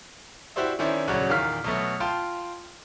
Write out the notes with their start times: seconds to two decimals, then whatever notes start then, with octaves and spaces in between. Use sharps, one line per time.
0.56 E4 F#4 G4 C5 D5 E5
0.79 D#3 C#4 E4 C5 D5
1.08 D#1 C#3 F#3 F#4 C#5 D5
1.29 E2 A#2 D#3 F5 F6 B6
1.64 B2 F#3 A3 B3
2.00 F4 G5 A5 C6